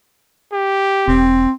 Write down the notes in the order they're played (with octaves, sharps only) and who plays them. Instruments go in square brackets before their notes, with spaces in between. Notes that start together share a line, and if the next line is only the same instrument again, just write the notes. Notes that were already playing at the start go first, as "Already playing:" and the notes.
[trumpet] G4
[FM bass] E1 [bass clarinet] C4